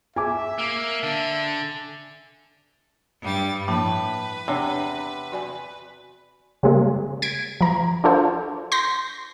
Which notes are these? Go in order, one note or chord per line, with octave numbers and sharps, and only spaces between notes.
E5 G#5 D6
A#3
D3
G2 G3 A6
A2 F3 A#3 B4
E2 C3 D4 C#5 D5
F#4 D5 G#5
C#3 G3 G#3 A#3
G#6 B6 D7
F3 A#5
D4 F4 F#4 A4 C5
C6 G6 A#6 B6